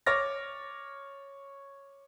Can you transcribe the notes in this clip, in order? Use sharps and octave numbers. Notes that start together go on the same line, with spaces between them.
C#5 D6 F6 A6 A#6